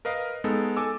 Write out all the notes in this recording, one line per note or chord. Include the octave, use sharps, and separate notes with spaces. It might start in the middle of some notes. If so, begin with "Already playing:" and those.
A#4 B4 D#5 F5
G#3 B3 D#4 A4
A4 G#5 D6 E6